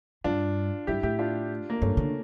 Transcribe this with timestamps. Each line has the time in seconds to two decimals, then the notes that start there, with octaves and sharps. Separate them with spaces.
0.24 G2 D4 F4
0.87 G2 E4 G4
1.03 A2 E4 G4
1.19 D4 F4
1.70 A#3
1.82 G2 A3 C#4
1.97 D3